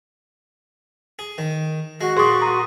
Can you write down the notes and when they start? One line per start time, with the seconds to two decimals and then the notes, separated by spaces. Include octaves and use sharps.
1.19 G#4
1.38 D#3
2.01 G#3 F#4
2.17 A#2 G3 G#4 C6 C#6 D#6
2.42 A#5 D#6